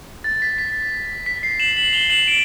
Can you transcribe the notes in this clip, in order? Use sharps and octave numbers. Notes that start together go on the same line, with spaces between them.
A6
B6
B6
B6
C7
E7 F#7
E7 F#7
F7 G7
E7 F#7
D7 E7